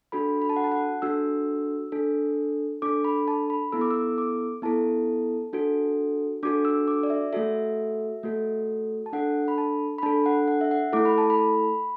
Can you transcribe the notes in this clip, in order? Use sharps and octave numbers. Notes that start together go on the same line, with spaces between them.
D4 F#4 A4 B5
B5
A5
F#5
A5
F#5
D4 F#4 A4 E6
D4 A4
D4 A4 D6
B5
A5
B5
B3 E4 A4 E6
D6
E6
D6
B3 E4 A4 A5
D4 F#4 A4
D4 F#4 A4 D6
E6
D6
D5
E5
A3 F#4 A4 E5
A3 F#4 A4
A5
D4 A4 F#5
B5
A5
B5
D4 A4 A5
F#5
F#5
E5
F#5
A3 E4 A4 D6
B5
A5
B5